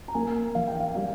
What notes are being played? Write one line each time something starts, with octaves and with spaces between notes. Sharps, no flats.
A#5
A#3 G#5
E3 F5
G5
F5
G5
G3 F5